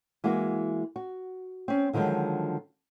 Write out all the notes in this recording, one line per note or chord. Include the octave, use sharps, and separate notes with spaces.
E3 G#3 A#3 F#4
F#4
C4 C#4
D3 D#3 F3 F#3 G#3